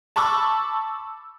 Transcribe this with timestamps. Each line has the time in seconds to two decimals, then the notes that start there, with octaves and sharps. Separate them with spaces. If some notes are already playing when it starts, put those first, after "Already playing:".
0.16 A5 B5 C#6 D6 E6